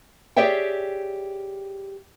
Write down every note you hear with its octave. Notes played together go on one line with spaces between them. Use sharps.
G4 G#4 C#5 D5 E5 G5